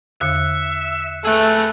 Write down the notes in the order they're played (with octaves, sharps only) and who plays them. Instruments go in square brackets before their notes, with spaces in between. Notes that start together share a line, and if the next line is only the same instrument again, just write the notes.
[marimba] E2 D3 [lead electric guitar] E5 [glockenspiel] F#6 C#7
[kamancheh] A3 [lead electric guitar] G#4 B4 [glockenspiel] E6 F#6